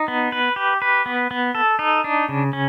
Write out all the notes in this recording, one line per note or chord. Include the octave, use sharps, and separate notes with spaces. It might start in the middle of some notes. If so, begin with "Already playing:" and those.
Already playing: D#4
B3
B4
G4
B4
B3
B3
A4
D#4
D4
C#3
C#4